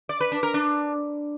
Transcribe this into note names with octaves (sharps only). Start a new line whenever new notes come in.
D5
B4
D4
A#4
D4